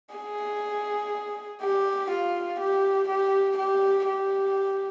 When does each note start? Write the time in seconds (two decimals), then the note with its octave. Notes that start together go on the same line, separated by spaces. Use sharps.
0.14 G#4
1.61 G4
2.10 F4
2.59 G4
3.08 G4
3.57 G4
4.07 G4